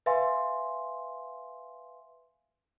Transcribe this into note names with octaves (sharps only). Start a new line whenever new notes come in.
B4 E5 F5 G#5 C6